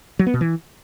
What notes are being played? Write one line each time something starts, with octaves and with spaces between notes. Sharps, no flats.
F#3
B3
B2
E3